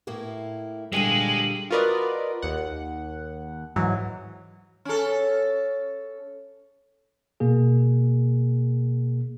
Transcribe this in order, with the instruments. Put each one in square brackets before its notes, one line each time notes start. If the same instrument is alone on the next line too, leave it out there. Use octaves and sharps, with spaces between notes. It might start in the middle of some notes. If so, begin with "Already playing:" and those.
[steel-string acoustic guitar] A2 A#3 E4
[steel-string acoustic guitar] A#2 D3 G3 [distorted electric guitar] G#3 G#4 [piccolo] F#7
[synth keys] F4 F#4 A#4 B4 D5 D#5
D#2 F#5
G#2 E3 F#3
[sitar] C#4 A4
[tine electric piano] B2 A#3 G#4